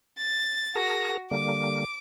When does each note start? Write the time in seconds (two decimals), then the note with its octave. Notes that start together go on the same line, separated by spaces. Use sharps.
0.18 A6
0.75 F#4 G#4 A#4 A5 A#6
1.31 D3 G3 A#3 D6